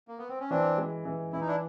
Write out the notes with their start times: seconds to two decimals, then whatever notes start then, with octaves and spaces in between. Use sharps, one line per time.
0.08 A#3
0.18 B3
0.28 C4
0.40 C#4
0.50 E3 C4 D4
0.78 G#3
1.05 E3
1.33 E3 E4
1.41 D#4
1.47 D4 E4